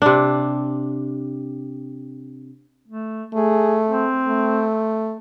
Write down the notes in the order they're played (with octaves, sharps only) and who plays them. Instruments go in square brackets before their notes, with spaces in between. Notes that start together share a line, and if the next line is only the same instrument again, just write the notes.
[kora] C3 D4
[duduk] A3
[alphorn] A3 [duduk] G#4
[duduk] C4
[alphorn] A3